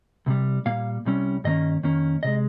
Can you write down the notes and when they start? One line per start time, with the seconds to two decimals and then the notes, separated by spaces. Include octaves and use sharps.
0.26 C2 C3 G3
0.66 A#2 G3 A#3 F5
1.05 C2 C3 G3 C#4
1.44 G2 D#3 A#3 C#4 D#5
1.83 F2 D#3 A#3 C#4
2.23 C3 G#3 D#5